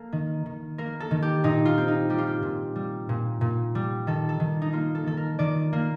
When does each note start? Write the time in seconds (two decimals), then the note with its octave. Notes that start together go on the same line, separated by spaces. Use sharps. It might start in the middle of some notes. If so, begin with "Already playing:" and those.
Already playing: A#3 A4
0.12 D#3
0.46 D#3
0.78 A#3 A#4
1.00 A4
1.11 D#3
1.22 G4
1.44 A#2 D#4
1.65 F4
1.78 C4
1.88 D#4
2.09 G3 G4
2.18 F4
2.27 G4
2.42 A#2
2.76 G3
3.09 A#2
3.41 A#2
3.75 G3
4.07 D#3 A4
4.29 A4
4.40 D#3
4.62 D#4
4.73 A#3 F4
4.95 A4
5.06 D#3 A4
5.17 A#4
5.39 D#3 D5
5.73 A#3